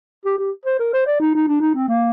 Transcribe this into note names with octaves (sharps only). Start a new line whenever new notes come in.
G4
G4
C5
A#4
C5
D5
D#4
D#4
D4
D#4
C4
A#3